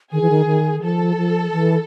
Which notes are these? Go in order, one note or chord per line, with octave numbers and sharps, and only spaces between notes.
D#3 G#4
E3
D#3
D#3
F3 A4
F3
E3